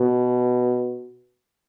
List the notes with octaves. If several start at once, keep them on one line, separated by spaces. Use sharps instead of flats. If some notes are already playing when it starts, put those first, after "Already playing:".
Already playing: B2